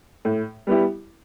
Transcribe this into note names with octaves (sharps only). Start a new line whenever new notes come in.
A2
G3 B3 E4 G4